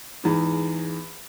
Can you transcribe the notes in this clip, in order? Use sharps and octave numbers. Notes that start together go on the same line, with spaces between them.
E2 G#2